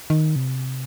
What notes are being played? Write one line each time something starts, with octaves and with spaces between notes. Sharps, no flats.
D#3
C3